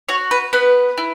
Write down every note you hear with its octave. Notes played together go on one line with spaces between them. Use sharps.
F#4 C#5
B4
B3 B4
E4